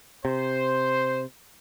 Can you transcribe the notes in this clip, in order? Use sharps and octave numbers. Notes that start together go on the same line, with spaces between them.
C3 C5